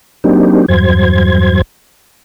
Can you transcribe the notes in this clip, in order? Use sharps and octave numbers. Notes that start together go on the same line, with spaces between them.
F#3 A#3 C4 D4 D#4 G4
E2 G2 F#3 C5 G#6